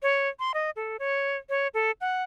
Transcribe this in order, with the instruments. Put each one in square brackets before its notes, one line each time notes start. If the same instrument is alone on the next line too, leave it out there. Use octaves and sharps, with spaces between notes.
[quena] C#5
C6
D#5
A4
C#5
C#5
A4
F#5